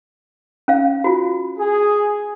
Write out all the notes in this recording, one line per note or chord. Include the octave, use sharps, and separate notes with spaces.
C#4 F5
F4 F#4
G#4